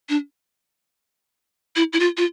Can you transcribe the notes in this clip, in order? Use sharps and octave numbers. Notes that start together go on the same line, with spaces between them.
D4
E4
E4
F4
F4